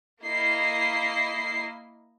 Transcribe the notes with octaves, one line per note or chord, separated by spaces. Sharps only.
A#3 E4 D#5 C7